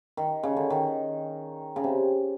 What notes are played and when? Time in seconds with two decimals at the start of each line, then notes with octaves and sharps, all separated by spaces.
0.17 D#3
0.43 C#3
0.57 D3
0.70 D#3
1.76 C#3
1.84 C3